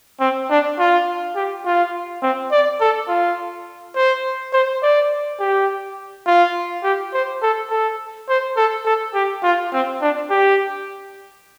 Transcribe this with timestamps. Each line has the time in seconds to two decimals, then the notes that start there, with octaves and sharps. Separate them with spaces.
0.20 C4
0.50 D4
0.79 F4
1.36 G4
1.65 F4
2.22 C4
2.52 D5
2.81 A4
3.09 F4
3.96 C5
4.53 C5
4.83 D5
5.40 G4
6.27 F4
6.84 G4
7.14 C5
7.42 A4
7.70 A4
8.29 C5
8.57 A4
8.85 A4
9.14 G4
9.43 F4
9.73 C4
10.01 D4
10.30 G4